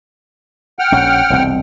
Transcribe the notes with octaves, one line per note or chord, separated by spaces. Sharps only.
F#5 G5 F6
A#1 C#4
E1 C2 C4